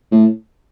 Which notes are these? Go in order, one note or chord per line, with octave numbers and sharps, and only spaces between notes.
A2